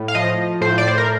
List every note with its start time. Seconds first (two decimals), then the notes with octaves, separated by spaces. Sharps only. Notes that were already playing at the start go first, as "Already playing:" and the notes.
Already playing: A2
0.08 F5
0.15 F3 D#5
0.61 A2 C5
0.78 D5
0.88 C5
0.98 A#4